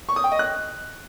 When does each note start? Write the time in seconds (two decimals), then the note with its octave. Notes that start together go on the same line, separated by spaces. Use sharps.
0.09 C#6
0.16 D#6
0.24 G5
0.32 D#5
0.39 F#6